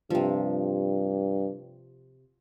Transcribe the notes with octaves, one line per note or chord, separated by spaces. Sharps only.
G2 C3 F3